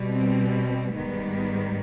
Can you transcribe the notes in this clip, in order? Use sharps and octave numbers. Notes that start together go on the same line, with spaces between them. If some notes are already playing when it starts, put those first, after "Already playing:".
Already playing: B2 G3
C4
G#2 D#3 G3 B3